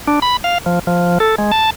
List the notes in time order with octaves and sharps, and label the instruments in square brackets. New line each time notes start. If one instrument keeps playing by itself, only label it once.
[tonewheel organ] D4
B5
F5
F3
F3
A4
G#3
A5